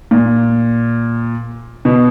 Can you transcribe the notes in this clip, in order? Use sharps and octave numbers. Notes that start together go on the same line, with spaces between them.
A#2
B2